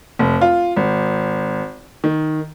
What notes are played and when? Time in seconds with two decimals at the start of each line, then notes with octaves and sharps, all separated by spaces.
0.19 F1
0.41 F4
0.76 G#1
2.04 D#3